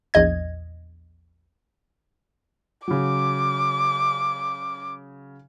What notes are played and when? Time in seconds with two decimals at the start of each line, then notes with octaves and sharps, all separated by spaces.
0.14 A#1 E2 D#5 G#6
2.88 C#3 F#3 D6